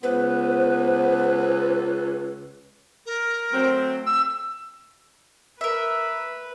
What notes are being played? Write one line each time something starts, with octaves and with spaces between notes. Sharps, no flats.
C#2 B3 B4 C5
A#4
F#3 A3 C4
E6
A#4 B4 E5